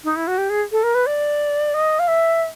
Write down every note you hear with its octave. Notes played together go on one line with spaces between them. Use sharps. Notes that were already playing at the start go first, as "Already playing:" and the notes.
D#4
E4
F#4
G4
G#4
A4
A#4
B4
D5
D#5
F5
E5